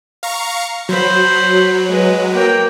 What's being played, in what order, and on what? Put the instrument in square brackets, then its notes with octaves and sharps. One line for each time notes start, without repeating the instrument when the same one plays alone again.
[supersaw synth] F5 A#5 C#6
[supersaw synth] F#3 [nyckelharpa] C5 B5
[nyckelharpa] G#3 B4
A#3 G5